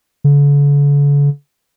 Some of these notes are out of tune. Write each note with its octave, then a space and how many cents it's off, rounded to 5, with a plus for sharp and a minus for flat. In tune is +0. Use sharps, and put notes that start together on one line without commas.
D3 -45